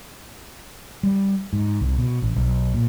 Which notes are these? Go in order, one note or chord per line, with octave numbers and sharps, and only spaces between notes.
G3
G#2
C2
B2
A1
B1
A#2